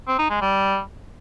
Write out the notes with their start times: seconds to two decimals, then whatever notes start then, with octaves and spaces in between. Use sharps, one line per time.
0.08 C4
0.19 D#4
0.30 G#3
0.41 G3